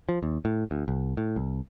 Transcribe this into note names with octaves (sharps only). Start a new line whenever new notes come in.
F3
D#2
A2
D2
C2
A2
C2